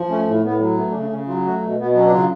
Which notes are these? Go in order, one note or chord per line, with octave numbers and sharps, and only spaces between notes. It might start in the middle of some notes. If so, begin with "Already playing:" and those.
Already playing: F3
A3 C#4
A2
A2 B3
F#3
A3 B3
D4
C#3 C#4
C#3 C#4
F#3 F4
A3 F#4
B2
B2 B3
B3
F#3 C#4
D4
C#3 F4